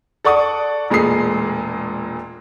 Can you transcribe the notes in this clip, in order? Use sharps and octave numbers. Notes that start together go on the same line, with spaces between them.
A4 D5 F#5 C#6 D#6
E1 A#2 G#3 A3 D#6 C7